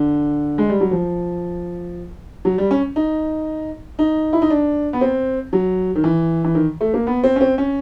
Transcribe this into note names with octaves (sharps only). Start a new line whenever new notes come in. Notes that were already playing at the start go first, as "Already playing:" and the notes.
Already playing: D3
G#3
G3
F#3
F3
F#3
G3
C#4
D#4
D#4
E4
D#4
D4
B3
C4
F#3
D#3
E3
E3
D#3
A3
A#3
B3
C4
C#4
C4
C#4